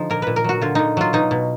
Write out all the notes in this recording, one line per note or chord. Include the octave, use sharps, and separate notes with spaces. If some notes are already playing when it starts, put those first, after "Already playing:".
Already playing: D3 F3 D#4
A#2 A#4
A#2 B4
A#4
F#3 F#4
D3 F4
D3 D#4
F#3 F4
B2 D#4
B2